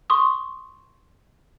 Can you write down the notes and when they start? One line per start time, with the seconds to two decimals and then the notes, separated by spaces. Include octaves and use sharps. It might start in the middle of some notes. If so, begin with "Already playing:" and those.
0.10 C6 C#6 D#6